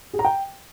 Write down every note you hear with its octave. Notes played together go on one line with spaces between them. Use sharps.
G#4
A#5
G5